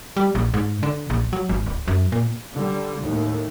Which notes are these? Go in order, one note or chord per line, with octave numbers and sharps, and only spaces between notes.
G3
A#1
G#2
D3
A#1
F#3
G#1
D1
F#2
A#2
D3 G3
D#2 A2